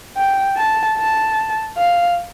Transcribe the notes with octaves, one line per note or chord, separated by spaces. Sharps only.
G5
A5
A5
F5